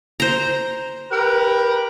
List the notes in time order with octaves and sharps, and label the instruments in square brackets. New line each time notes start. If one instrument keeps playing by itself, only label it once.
[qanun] C5 A#5
[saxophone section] G4 A#4 B4